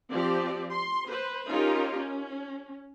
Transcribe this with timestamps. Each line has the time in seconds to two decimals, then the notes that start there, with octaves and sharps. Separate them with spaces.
0.12 F3 C4 G4 D5
0.73 C6
1.10 B4 C5
1.49 C#4 D#4 F4 G4 A#4
1.98 C#4